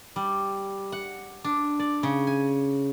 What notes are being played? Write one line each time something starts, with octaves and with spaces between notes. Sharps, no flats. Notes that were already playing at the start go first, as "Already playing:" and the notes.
G3
F#5
D4
D5
C#3
G#5